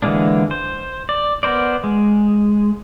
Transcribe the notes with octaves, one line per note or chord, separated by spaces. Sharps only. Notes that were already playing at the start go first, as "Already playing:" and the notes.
D3 E3 G#3 A#3 D4
C5
D5
B3 A#4 C5 D5
G#3